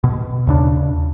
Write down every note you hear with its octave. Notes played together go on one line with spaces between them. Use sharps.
B2
D#2 C#3 D4